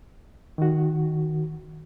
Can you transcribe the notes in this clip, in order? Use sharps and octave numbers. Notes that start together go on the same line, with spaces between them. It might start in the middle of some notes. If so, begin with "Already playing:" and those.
D#3 F#4